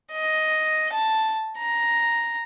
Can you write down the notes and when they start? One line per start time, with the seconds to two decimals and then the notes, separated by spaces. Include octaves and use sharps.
0.12 D#5
0.93 A5
1.58 A#5